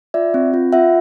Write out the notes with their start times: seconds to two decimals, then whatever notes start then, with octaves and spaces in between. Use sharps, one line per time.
0.14 F4 D5 E5
0.34 C4
0.54 F4
0.72 F4 E5 F#5